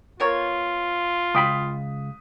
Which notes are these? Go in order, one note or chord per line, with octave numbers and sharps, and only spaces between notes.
B3 F4 A#4 C#5
C#2 G5 B5 D#6 B6